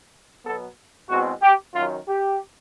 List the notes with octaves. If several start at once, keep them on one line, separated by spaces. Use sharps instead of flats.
B2 F#3 B3 A4
E2 B2 G#3 C4 F#4
G4
F#2 D#3 F#3 F4
G4